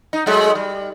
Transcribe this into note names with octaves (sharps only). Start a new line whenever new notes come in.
D#4
F#3 G#3 A3
G3